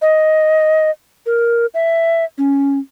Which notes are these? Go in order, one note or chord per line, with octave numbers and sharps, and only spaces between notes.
D#5
A#4
E5
C#4